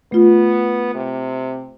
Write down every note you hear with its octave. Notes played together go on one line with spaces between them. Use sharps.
A3 B3 F4
C3